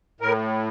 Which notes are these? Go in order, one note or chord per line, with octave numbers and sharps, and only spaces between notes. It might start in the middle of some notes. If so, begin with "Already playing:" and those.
A2 A#4